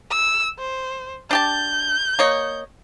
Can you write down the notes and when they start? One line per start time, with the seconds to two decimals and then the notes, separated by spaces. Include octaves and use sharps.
0.10 E6
0.59 C5
1.31 D4 G4 A5 G6
2.19 A#3 C#5 D#5